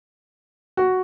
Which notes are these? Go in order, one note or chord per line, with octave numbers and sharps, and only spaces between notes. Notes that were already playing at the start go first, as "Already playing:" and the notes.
F#4